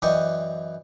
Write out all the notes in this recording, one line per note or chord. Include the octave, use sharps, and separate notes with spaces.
F#2 E3 D5 D#5 G5 C#6